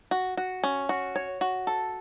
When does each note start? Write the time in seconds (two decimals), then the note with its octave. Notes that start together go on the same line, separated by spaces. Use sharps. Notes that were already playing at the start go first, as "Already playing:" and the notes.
0.11 F#4
0.37 F#4
0.63 C#4
0.89 F#4
1.16 C#5
1.41 F#4
1.67 A4